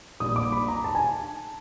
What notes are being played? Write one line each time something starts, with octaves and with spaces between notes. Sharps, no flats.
A#1 A#2 G3 D#6
D6
B5
A#5
A5
G#5
A5